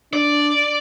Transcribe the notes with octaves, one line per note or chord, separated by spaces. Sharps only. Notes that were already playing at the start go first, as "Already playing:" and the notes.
D4 D5